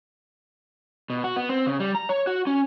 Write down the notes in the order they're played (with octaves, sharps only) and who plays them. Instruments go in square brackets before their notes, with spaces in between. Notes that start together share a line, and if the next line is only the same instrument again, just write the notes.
[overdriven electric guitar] B2
F#4
B3
C4
C#3
G3
A#5
C#5
F#4
C#4